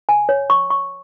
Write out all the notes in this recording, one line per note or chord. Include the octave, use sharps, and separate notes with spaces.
G#5
C#5
C#6
C#6